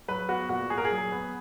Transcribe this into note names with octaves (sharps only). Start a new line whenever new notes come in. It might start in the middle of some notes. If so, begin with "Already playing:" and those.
F#3 B4
B3 F#4
A#2 F#4
A#2 G#4
A#4
G#4
F#3
B3